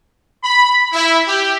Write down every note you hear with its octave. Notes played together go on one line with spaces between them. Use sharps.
B5
E4
G4